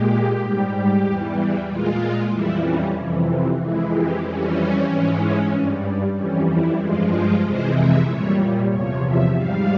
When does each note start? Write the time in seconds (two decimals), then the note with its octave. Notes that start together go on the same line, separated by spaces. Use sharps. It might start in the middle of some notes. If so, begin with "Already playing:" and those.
Already playing: A#2 G#3 G4
0.39 G#2 G3
1.04 E2 E3 G3
1.68 A#2 G#3 F4
2.31 F2 E3 G3 E4
2.63 C#4
2.95 F2 C3 E3
3.59 F2 E3 G#3 E4
3.91 G4
4.23 F2 E3 G3 C#4
4.87 G#2 E3 G#3
5.50 G2 G3
6.15 F2 E3 G3 C#4
6.46 E4
6.79 G2 F3 G#3 F4
7.11 F4
7.42 F2 C3 E3 G#3 C5
7.75 E5
8.06 A#2 G3 C#5
8.70 E2 C3 F3 C#5
9.03 E5
9.34 G#2 G3 F5